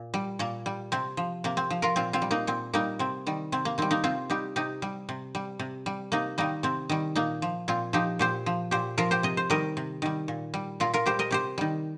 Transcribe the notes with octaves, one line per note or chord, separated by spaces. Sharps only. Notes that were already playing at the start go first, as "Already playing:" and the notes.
Already playing: A#2
G3
A#2 A#3
G3
C3 C4
F3
C3 A#3
C4
F3
F4 A#4
A#2 C4 F4
C4 F4
G3
A#3 D#4
A#2 C4
G3 A#3 D#4
C3 C4
D#3 G3
C3 C4
A#3
D#3 G3 C4
A#3 D#4
C3 C4 F4
G3 D#4 G4
C3 D#4 G4
G3
C3
G3
C3
G3
C3 A#3 D#4
D#3 G3 A#3 D#4
C3 C4
D#3 G3
A#2 A#3 D#4
F3
A#2 C4 F4
F3 D#4 G4
A#2 G4 C5
F3
A#2 G4 C5
F3 F4 A#4
G4 C5
C3 D#5
C5
D#3 G3 A#4 D#5
C3
D#3 G3
A#2
G3
A#2 F4 A#4
F4 A#4
G3 G4 C5
A#4 D#5
C3 G4 C5
D#3 G3